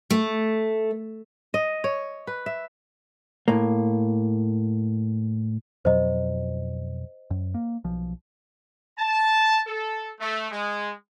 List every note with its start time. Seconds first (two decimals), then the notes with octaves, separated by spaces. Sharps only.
0.10 A3
1.54 D#5
1.84 C#5
2.27 B4
2.46 E5
3.48 A2 A#3
5.85 F2 B2 F#3 C5 D#5
7.31 F#2
7.54 A#3
7.84 B1 F3
8.98 A5
9.67 A4
10.20 A3
10.51 G#3